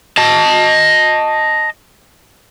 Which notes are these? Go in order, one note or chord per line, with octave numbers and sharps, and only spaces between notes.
D#5 A5